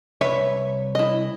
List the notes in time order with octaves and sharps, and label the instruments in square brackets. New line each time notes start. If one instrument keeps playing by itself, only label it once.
[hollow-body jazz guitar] C2 B4 C#5 [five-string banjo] E5
[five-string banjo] E4 D#5